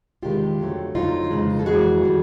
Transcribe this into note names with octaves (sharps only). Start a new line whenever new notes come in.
E2 C3 D#3 G#3 F4 G4
F2 D3 F#3 A3
F2 D3 F#3 A3 D#4 F4
F2 C#3 E3 G#3
A4
F2 C#3 E3 G#3 F#4 G#4
D#3 G3